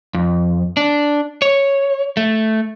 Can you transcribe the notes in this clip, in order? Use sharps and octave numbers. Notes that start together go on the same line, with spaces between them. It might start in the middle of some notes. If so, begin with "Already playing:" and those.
F2
D4
C#5
A3